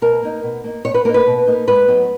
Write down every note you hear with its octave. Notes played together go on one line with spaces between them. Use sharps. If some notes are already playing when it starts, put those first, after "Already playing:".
B2 A#4
A#3 D#4
B2
A#3 D#4
B2 C#5
B4
A#3 D#4 A#4
B4
B2
A#3 D#4
G#2 B4
F#3 B3 D#4